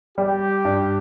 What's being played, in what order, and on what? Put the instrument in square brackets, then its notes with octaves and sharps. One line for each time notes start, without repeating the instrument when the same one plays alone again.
[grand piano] G3 [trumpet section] G4
[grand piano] G2